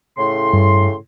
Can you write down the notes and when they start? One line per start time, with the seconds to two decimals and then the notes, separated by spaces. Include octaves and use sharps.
0.18 A2 C#3 C6
0.53 G2